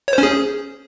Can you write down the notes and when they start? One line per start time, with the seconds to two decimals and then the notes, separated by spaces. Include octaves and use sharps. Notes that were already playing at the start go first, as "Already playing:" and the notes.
0.08 C#5
0.13 C5
0.18 C#4
0.23 G#4